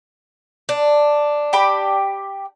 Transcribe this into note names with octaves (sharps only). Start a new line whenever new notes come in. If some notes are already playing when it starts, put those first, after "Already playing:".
D4
G4 G5 B5